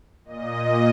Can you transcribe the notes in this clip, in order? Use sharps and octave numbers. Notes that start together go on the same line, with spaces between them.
A#2 D#5